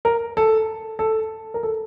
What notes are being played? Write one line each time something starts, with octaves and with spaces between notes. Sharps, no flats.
A#4
A4
A4
A#4
A4